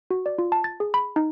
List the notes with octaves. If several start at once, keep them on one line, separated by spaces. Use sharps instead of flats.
F#4
D5
F4
A5
A6
G#4
B5
D#4